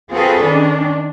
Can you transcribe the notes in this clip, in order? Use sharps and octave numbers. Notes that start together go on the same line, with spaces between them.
C4 F4 F#4 G#4 A4 B4
D#3 C#4 D4